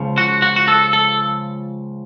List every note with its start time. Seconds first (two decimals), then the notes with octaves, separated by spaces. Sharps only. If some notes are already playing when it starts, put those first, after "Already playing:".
Already playing: C#2 C#3 F3
0.18 F#4
0.42 F#4
0.56 F#4
0.68 A4
0.93 A4